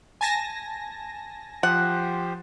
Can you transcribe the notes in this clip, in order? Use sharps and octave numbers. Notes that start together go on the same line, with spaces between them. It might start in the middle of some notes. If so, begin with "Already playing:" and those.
G#5 A5 A#6
F3 G4 C5 F#5